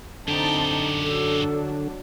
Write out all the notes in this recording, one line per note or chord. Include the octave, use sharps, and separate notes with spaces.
F#2 D3 C4 D#4 G4 A5
F#3 D4 A4